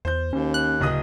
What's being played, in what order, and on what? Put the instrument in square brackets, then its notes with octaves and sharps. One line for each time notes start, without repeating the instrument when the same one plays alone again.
[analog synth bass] E2 [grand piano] C5 G6
[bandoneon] D#2 [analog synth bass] C#4
[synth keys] F#6
[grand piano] D1 D#5 D#6 [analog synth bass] C#3